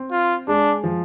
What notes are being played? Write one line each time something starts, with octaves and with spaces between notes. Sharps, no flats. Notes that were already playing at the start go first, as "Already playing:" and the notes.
Already playing: C4
F4
G#3 D4
F3